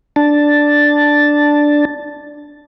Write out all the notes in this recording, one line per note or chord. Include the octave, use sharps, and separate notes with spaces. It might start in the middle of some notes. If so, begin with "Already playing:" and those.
D4 A5